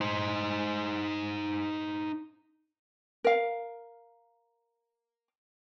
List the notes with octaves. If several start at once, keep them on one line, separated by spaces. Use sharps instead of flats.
D#4 C5
A#4 F5